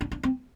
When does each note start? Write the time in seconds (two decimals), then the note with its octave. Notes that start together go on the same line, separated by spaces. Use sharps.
0.01 D4
0.12 D4
0.23 C4